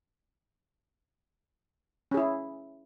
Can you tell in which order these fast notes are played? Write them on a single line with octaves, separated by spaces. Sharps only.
C#4 G#4 E4